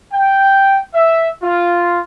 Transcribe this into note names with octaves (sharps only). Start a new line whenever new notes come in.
G5
E5
F4